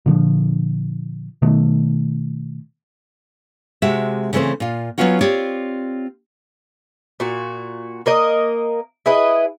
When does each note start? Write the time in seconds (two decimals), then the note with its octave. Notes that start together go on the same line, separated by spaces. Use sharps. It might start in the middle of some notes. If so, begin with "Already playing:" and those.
0.06 A#2 D3 F3
1.42 B2 D#3 A3
3.82 C3 G#3 F#4 G4 E5
4.33 C#3 E3 A3 C4 C5
4.60 A#2 F4
4.98 F#3 G#3 B3 C#4 F4 F#4
5.21 C4 F4 G4 C#5 D5
7.20 A#2 F#4
8.06 A#3 A#4 D#5
9.06 E4 G#4 B4 D#5